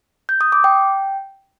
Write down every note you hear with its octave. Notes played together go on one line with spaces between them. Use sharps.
G6
D#6
D6
G5